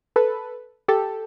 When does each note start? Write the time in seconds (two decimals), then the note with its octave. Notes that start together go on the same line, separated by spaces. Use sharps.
0.16 A4 B4
0.88 G4 A4